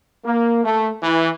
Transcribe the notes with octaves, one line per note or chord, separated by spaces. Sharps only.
A#3
A3
E3